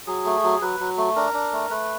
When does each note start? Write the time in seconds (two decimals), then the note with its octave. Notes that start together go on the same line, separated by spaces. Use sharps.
0.07 F#3 G#4
0.26 A3
0.44 F#3
0.61 F#3 B4
0.80 F#3
0.97 A3
1.16 D4 A#4
1.34 D4
1.52 A3
1.70 A3 B4